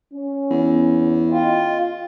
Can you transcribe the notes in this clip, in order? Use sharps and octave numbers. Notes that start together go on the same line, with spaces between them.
C#4
E2
F4 D#5 G5